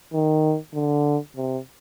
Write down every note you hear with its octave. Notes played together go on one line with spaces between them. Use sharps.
D#3
D3
C3